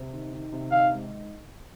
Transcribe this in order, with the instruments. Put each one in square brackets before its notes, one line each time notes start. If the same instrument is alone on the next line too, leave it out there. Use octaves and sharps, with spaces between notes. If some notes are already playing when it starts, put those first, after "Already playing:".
Already playing: [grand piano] C3
D#3
D#3
C3
[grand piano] D#3 [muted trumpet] F5
[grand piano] G#2